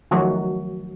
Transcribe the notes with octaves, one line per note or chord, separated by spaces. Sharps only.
D#3 F3 F#3 A3 F#4